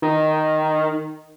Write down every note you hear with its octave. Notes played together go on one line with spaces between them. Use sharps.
D#3